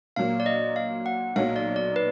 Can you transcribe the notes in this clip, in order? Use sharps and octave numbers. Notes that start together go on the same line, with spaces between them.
A#2 F#3 A#3 F5
D5
D#5
F5
F#5
B1 A#2 F#3 F5
D5
D5
B4